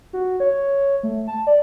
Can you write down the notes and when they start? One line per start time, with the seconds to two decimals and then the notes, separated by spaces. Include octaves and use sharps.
0.13 F#4
0.40 C#5
1.03 A3
1.28 A5
1.47 D5